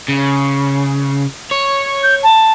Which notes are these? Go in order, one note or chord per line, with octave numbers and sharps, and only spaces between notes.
C#3
C#5
G6
A5